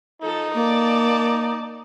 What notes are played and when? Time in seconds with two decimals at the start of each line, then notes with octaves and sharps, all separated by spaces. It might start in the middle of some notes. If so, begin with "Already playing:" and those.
0.22 F3 D#4 A4
0.55 A#3 D5 A5